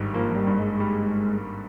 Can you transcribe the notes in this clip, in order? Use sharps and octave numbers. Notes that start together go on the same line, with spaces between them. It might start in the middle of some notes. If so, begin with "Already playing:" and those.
Already playing: G#1 G2 G3
F3 A#3
G3
G2
G#3
G3